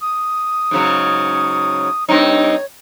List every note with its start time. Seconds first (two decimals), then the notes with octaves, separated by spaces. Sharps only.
0.01 D#6
0.71 G#2 C#3 F#3
2.09 G2 C4 D#4 C#5